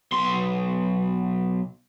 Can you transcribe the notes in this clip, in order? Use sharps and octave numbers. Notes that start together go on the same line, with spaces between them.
B1 C6